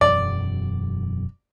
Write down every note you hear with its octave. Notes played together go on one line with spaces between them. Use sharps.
E1 F#2 F#3 D5